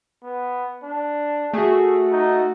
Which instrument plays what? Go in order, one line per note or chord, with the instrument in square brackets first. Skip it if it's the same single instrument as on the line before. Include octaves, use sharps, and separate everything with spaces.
[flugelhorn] B3
D4
[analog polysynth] A3 F#4 [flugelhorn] G#4
[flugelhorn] D#4